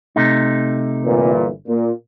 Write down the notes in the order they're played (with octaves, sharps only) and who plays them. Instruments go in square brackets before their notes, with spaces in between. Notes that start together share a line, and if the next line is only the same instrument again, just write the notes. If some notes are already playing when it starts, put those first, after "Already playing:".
[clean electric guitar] C3 A3 D#4
[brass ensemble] G1 A#2 E3
A#2